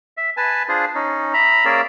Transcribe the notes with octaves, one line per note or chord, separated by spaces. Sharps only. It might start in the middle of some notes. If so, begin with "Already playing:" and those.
E5
B4 G#5 A5
D4 F4 G#4 C5
C#4 D#4
E5 A#5 B5
A#3 C#4 G#4 A#4 D5 E6